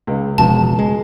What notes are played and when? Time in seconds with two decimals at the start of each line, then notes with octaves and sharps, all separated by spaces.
0.07 C#2
0.38 E1 C#2 B2 F3 A5
0.79 G#3